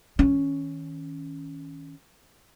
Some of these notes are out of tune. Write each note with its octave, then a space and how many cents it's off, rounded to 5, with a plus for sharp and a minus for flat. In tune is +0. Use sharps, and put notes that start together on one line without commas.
D#3 +35 C#4 +0